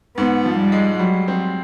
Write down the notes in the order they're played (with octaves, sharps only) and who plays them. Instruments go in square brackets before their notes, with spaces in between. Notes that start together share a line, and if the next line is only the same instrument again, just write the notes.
[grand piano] G#2 [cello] B3
[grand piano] F3
[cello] G3
[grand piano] G#3
[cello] F#3 [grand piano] G3
[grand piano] C4